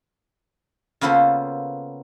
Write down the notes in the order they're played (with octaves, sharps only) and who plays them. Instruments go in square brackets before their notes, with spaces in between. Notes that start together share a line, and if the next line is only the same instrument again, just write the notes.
[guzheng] C#3 A#3 B3 F4 A4 C5